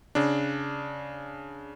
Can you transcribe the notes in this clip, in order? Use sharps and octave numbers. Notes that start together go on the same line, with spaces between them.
C#3 D4